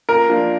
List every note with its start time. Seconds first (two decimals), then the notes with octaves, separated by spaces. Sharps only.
0.09 A#2 A#4
0.29 F3 A#3 D4 F4